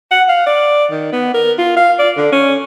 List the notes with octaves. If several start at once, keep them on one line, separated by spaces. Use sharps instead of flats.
F#5
F5
D5
D#3
B3
A#4
F4
F5
D5
D3
C#4